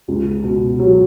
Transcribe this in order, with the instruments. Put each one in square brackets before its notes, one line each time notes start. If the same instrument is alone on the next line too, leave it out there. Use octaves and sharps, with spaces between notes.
[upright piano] C#2
B2
F#3